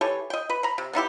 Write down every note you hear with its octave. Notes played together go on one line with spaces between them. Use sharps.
E3 G4 A4 C#5
D#5 G5
B4
A#5 B5
C3
B3 D#4 E4 G4